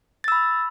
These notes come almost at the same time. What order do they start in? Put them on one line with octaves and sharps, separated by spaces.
A6 E6 B5